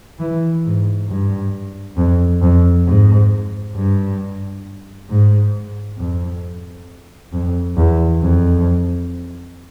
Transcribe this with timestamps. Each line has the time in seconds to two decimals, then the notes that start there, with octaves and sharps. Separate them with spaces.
0.20 E3
0.65 G#2
1.09 G2
1.97 F2
2.42 F2
2.87 G#2
3.76 G2
5.09 G#2
5.98 F2
7.33 F2
7.77 E2
8.22 F2